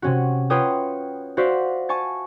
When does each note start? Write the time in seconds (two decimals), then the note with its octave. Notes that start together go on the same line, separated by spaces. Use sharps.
0.02 C3 C#4 F#4
0.50 F4 B4 C#5 G5 D#6
1.37 F#4 C5 D5 E5 F5
1.89 G#5 A5 C#6 A6